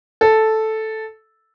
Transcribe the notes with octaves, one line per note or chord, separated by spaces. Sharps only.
A4